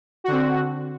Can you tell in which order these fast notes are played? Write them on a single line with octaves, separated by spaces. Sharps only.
F#4 D3 C4